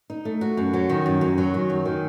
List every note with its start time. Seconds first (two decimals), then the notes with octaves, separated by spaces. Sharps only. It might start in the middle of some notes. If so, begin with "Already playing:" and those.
0.10 D#4
0.25 A3
0.41 F#4
0.57 F#2
0.73 F#3
0.89 D#3
1.06 F#2
1.21 F#2
1.38 F#3
1.54 D#3
1.70 F#2
1.85 D#3